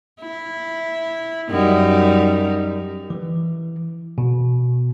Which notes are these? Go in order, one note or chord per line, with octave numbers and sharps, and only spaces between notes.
E4
F#2 G3 D#4
E3
B2